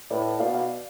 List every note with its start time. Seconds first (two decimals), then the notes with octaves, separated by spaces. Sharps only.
0.10 A2 B4 D5
0.40 B2 D5 F5
0.54 D5 F5